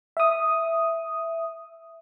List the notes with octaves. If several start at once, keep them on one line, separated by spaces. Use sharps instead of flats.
E5 D#6